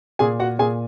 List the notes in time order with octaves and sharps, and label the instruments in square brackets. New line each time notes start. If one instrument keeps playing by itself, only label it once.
[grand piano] A#2 G#4 G#5
F#4 F#5
A#2 G#4 G#5